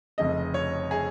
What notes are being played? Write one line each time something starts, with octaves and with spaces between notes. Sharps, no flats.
F1 F2 C#3 D#5
C#5
G#4